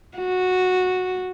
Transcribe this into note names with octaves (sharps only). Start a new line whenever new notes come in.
F#4